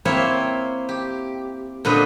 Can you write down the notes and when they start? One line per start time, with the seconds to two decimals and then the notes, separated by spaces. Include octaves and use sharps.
0.05 A#3 C4 E4 C#5 E5
0.89 G4
1.85 A#2 D3 B4 C5 D#5